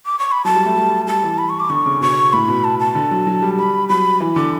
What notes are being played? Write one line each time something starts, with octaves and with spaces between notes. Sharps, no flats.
D6
C#6
B5
F#3 A5
G3
A3
G3
G3 A5
E3
B5
C#6
D6
D3 C#6
C#3
B2 C#6
A2 B5
B2
A5
A5
D3
F#3
F#3
G3
G3 B5
F#3 B5
E3
D3 D6